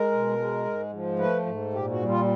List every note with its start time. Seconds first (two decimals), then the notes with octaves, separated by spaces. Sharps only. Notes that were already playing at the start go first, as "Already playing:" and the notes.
Already playing: G#3 A#4
0.11 B2
0.38 G#3
0.66 G#2
0.92 F3
1.19 A3 B4
1.46 G#2
1.73 A#2 G4
1.91 F#4
2.00 G3
2.09 F4